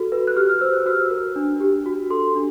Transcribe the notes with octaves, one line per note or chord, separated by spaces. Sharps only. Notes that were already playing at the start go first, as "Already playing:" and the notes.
Already playing: F#4 A4
B4
F#6
G4 F6
F6
C5 E6
F#6
F6
F#4 E6
A#4
D4
G4
F#4
A4 C6
D4